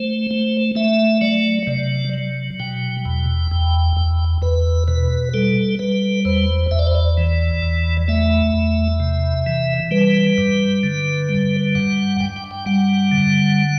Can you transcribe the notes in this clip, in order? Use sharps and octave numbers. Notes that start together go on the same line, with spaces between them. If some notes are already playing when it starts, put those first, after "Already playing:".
Already playing: A3 C5
A3
A3 E5
F#3 D5
C3 D5
F#3
B2 G5
E2
E2
E2
E2 B4
B2 B4
G3 A4
G3 B4
E2 C5
E2 E5
D5
C5
D5
E3
E2
A3 E5
E2
C3
E3
G3 B4
G2
D3
G3
G2 F#5
G2 G5
G5
G5
G3 F#5
D3